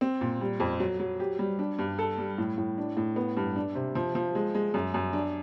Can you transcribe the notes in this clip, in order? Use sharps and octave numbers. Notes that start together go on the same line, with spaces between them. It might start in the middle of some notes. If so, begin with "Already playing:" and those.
C4
A#2
G3
F2
F#3
F#3
G4
G3
D4
G2
A4
G3
A2
A2
D4
A2
B3
G2
D4
C3
F3
F3
G#3
G#3
F#2
F#2
D4